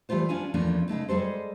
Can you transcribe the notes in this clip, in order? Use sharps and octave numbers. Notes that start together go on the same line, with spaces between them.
E3 G3 A3 F4 C5
C#4 D4 F4 G#5
E2 F3 A3 A#3 C#4 D4
C#3 G#3 A3 D#4
G3 G#3 G#4 A4 C5